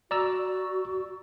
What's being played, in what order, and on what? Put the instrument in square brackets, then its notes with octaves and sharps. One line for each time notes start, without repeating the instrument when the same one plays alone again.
[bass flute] F#4 [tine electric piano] D5 A#5 E6